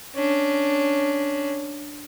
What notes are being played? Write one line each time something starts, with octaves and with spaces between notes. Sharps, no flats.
C#4 D4